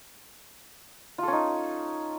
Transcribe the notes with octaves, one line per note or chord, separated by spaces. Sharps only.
C#4 D#4 F4 A4